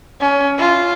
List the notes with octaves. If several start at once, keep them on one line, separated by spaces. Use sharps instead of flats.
C#4
F4